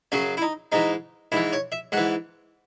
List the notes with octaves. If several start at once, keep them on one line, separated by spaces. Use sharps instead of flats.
F#2 C#3 F#3 C#4
E4
D#4
G#2 E3 D#4
G#2 E3 E4
C#5
E5
G#2 E3 F#5